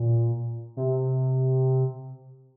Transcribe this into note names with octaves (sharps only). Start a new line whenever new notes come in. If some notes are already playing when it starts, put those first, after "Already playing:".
Already playing: A#2
C3